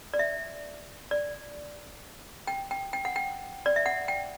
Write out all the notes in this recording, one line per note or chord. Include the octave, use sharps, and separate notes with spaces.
D5
E5
D5
G5
G5
G5
F#5
G5
D5
E5
F#5
G5